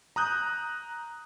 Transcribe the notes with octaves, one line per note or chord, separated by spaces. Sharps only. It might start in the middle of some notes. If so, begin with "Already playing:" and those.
A#5 D#6 F#6 G6